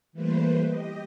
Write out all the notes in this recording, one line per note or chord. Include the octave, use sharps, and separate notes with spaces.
E3 G3 A3 A#3 B4 C5
G4 D#5